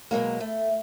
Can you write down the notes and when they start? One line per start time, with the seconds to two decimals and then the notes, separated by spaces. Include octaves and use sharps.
0.11 B2 F#3 G#3 A#3
0.40 A3